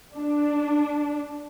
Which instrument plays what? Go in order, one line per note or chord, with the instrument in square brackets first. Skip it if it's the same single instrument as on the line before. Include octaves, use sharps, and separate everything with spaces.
[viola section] D4